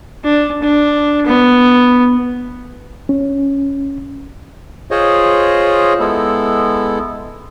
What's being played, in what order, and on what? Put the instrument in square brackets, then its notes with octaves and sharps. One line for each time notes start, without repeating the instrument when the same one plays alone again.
[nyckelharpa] D4
D4
B3
[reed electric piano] C#4
[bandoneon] F4 G#4 C5 C#5 D#5
G#3 B3 E4 A4